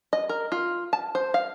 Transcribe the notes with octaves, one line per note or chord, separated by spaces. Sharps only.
D#5
A#4
F4
A5
C5
F5